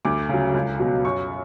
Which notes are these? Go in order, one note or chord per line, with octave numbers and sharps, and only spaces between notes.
D2 D6
C#3 F#3
C#2
B2 F#3
F#2 C#6